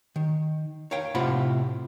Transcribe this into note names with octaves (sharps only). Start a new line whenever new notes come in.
D#3
C#5 F5 G5
A2 C3 F4 C5 F#5 B5